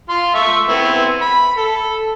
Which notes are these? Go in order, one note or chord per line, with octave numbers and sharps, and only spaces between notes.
F4 C6
A3 E5 C#6
B3 C4 E4
B5
A4